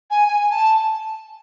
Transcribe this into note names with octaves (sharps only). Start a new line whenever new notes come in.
G#5
G#5
A5